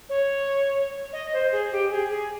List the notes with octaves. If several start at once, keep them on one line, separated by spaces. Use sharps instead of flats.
C#5
D#5
C5
G#4
G4
G#4
G#4